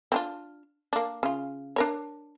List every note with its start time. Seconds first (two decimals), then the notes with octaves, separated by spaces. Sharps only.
0.12 C4 D4 F4
0.93 A#3 D4
1.23 C#3 F4
1.76 D4 A#4 C#5